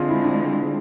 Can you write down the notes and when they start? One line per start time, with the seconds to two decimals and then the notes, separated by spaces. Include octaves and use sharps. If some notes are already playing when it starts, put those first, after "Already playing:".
Already playing: D3 G#3 C4 F4 G#4
0.09 E4
0.24 D4